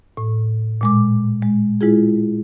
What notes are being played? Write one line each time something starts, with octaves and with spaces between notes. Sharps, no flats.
A2
A#2 G#3 D6
G#3
G#3 E4 F4 G#4